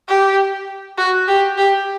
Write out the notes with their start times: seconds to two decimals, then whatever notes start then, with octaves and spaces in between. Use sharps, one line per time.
0.09 G4
0.98 F#4
1.28 G4
1.58 G4